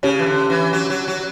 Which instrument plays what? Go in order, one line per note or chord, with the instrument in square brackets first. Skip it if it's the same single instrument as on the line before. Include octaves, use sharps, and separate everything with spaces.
[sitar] C#3 [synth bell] C#4 G4 C#5
[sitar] E3
D3
E3
F#3
F#3
F#3